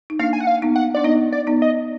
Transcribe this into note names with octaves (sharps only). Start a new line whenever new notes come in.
D#4
A#3 D4 F5
G#5
F#5
F5
B3 D#4
F#5
D4 D5
B3 D#4 D#5
D5
B3 D#4
D#5